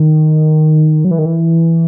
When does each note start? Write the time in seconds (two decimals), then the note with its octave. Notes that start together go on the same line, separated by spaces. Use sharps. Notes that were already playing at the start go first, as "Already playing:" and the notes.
Already playing: D#3
1.05 F#3
1.11 E3
1.19 D#3
1.25 E3